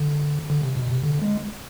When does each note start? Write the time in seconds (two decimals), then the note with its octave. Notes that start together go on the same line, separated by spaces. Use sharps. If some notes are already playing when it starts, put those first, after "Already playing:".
Already playing: D3
0.50 D3
0.63 C3
0.76 B2
0.91 C3
1.04 D3
1.22 G#3